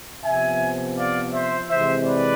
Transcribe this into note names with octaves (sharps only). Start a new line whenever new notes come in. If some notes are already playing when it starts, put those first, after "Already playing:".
C3 F3 B3 E5 G#5
D5 F5
C5 E5
C3 E3 G#3 C4 C5 E5
B4 D5